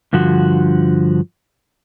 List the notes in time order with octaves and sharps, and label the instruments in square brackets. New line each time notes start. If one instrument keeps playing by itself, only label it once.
[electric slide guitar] G2 D3 F3 F#4